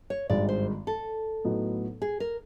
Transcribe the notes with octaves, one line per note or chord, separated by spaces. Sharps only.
C#5
G#1 G2 D#3 G#3 D5
C5
A4
A2 F#3 B3 D#4
G#4
A#4